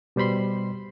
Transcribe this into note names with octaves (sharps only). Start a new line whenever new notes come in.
B2 G3 C5 B5 C6